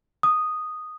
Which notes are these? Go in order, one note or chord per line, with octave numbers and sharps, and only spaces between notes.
D#6